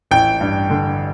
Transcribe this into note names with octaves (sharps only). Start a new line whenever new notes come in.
A1 G5
G2
D3